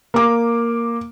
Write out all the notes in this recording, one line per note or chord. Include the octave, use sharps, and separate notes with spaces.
A#3 D6